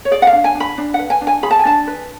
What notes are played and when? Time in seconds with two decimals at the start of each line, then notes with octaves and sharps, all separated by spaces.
0.05 C#5
0.11 G#4 D5
0.22 F#5
0.27 F5
0.33 D4
0.44 G#5
0.55 D4
0.60 B5
0.78 D4
0.94 F#5
0.99 B4
1.10 G#5
1.21 D4
1.27 G#5
1.43 G#4 B5
1.51 A5
1.59 G#5
1.65 D4 A5
1.87 B4